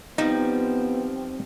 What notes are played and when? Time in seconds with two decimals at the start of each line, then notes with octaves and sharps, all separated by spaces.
0.18 F3 G3 B3 C4 D#4